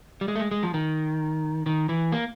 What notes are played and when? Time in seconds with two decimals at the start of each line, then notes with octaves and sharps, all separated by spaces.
0.21 G3
0.28 G#3
0.36 A3
0.40 G#3
0.51 G#3
0.63 F3
0.74 D#3
1.66 D#3
1.89 E3
2.12 A#3